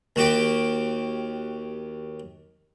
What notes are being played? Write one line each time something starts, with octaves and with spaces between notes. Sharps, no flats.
D#2 F#4 G4 G5